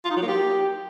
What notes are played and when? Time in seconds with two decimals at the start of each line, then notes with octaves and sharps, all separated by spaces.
0.05 F4
0.11 D#4
0.16 F#3
0.22 A#3
0.28 G4